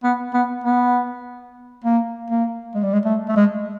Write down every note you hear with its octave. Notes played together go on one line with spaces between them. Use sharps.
B3
B3
B3
A#3
A#3
G#3
G3
G#3
A3
A3
G#3